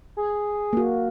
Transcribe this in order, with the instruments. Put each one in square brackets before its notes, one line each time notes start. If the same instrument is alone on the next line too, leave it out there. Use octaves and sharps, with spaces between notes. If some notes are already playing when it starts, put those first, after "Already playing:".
[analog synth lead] G#4
[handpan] A#3 F#4